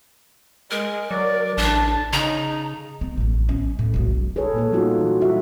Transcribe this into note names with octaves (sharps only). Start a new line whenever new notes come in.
G#3 A#4
F#3 D5
A1 D4 A5
C#3 D#4 A#5
C4
A1 A3
C#4
A2
E1 B1
G#4 A4 B4 C#5
A#2 A#3 A4
F#3 G3 B3 D#4 F4 F#4
E3
G3 E4 F#4 E5